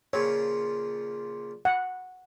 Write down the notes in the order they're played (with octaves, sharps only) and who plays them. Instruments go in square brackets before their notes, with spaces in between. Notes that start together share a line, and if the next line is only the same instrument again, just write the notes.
[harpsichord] A#2 C#3 F3 [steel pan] C#5
[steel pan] F#5